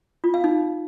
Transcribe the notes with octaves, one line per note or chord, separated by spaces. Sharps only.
F4
F5
D#4